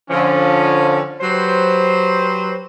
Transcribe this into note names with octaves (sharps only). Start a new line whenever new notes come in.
D3 F3 C#4
F#3 G4 B4 C5